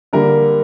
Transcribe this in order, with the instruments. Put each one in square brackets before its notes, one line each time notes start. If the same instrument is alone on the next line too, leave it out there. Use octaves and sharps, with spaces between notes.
[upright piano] D3 G3 A#3 A#4